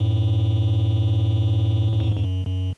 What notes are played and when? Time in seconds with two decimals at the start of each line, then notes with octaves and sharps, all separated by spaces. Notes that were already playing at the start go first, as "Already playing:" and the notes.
Already playing: F#2 A2
1.93 F#2
2.00 F2 G#2
2.16 F2
2.24 F#2
2.47 F#2